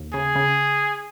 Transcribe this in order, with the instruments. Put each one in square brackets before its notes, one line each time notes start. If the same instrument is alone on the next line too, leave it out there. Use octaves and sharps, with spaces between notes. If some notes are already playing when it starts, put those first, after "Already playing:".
Already playing: [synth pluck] D#2
[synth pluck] C#3 [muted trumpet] G#4
[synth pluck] C#3